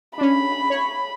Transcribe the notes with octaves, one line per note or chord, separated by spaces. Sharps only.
C#4 D4 B5
C#5